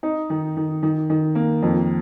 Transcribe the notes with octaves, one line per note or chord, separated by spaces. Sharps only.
D#4
D#3
D#3
D#3
D#3
A#3
F2